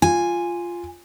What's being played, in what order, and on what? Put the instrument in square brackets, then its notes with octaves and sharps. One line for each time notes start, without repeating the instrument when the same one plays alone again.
[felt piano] F4 [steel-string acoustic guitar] G#5